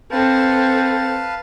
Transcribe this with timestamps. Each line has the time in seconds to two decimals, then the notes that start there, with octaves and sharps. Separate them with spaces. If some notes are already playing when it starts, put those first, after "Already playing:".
0.11 C4 A4 B4 F5 A5